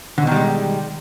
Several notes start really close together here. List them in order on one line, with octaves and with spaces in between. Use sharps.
D3 B2 D#3 G3 G#3